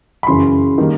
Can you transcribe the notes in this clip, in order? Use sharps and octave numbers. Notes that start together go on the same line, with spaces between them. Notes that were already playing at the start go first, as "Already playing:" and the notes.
B5
F#2 C#3 E3 C6
D#3 G3 A#3